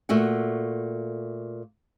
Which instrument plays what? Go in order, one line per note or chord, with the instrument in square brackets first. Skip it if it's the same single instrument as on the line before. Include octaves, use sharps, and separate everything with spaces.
[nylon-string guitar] A#2 A3 F#4 F#5